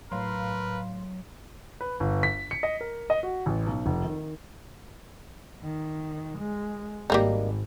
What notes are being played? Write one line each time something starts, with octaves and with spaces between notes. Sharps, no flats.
A2 F#3 A#4 B4 F5 C6
B4
G1
B6
C#7
D#5
A#4
D#5
F#4
A1
B1
F1
D#3
D#3
G#3
G#1 G3 A#3 D#4